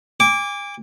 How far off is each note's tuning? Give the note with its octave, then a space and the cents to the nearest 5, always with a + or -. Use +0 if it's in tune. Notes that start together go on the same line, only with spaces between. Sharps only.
G#5 -40 D6 -10